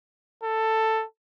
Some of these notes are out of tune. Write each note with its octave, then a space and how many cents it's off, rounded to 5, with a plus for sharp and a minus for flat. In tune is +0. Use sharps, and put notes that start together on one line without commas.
A4 +10